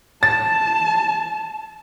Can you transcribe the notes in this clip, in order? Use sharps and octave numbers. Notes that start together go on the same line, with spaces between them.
A5 A6